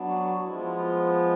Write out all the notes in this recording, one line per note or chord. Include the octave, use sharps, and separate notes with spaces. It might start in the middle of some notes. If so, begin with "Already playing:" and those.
Already playing: F#3 B3 D4
F#4
F#4
F3 G#3 B3 E4 F#4
F4
E4
F4